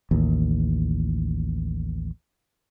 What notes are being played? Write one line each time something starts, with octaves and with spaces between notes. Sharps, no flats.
A1 D#2